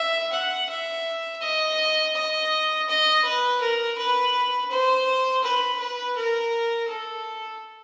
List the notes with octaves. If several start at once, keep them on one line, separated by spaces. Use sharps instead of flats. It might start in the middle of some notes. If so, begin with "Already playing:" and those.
Already playing: E5
F#5
E5
D#5
D#5
D#5
B4
A#4
B4
C5
B4
B4
A#4
A4